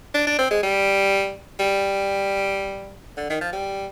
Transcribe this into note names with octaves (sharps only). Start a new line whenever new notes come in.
D4
D4
C4
G#3
G3
G3
D3
D#3
F3
G3